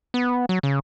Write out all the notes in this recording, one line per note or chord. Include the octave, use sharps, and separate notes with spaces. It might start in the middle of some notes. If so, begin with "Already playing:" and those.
B3
F#3
C#3